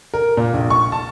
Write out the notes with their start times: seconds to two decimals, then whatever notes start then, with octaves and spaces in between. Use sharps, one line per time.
0.14 A#4
0.37 A#2
0.54 A#1
0.70 C#6
0.92 A5